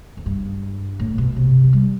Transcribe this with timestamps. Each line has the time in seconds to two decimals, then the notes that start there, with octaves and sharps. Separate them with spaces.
0.17 F2
0.26 G2
1.00 A2
1.18 B2
1.36 C3
1.64 F3
1.73 G3